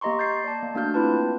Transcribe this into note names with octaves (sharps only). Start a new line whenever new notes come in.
A#3 G4 D#5 A#5 C6 C#6
G6 A6 C7
D5 A5
A#3
A3 A#3 D4 F#4 F6 G6
C4 E4 F4 B4 A5